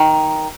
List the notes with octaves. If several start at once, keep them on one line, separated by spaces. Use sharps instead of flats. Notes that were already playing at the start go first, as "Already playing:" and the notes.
Already playing: D#3